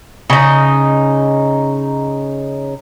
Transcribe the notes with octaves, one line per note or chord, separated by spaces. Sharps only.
C#3 D#4